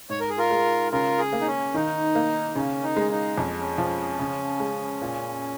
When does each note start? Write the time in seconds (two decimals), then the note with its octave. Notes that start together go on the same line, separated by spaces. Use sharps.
0.10 G#2 C#5
0.20 A#4
0.29 G#4
0.38 F4 A#4
0.51 G#3
0.92 C#3 F4 A#4
1.19 G#4
1.33 A#3
1.41 D#4
1.47 C#4
1.74 D#3 D#4
2.15 A#3
2.55 C#3 C#4
2.83 D#4
2.96 G#3
3.11 D#4
3.38 F2 C#4
3.60 C#4
3.78 F3
4.19 C#3
4.60 G#3
5.02 A#2